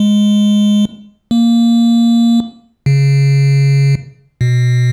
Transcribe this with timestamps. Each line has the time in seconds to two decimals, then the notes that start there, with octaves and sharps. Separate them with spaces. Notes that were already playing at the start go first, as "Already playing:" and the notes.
Already playing: G#3
1.31 A#3
2.86 C#3
4.41 B2